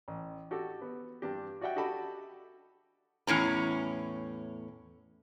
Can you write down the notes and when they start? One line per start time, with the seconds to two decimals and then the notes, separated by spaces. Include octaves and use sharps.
0.08 A1
0.51 F#4 G4 A4
0.82 B3
1.22 G2 D4 G4
1.61 F#4 D5 E5 F#5 G5
1.76 F#4 G4 A4 D#5 A5 B5
3.27 E2 A2 C#4 A#5